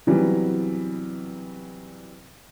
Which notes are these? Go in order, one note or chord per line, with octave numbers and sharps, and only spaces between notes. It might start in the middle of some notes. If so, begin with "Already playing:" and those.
C3 E3 F#3 G3 B3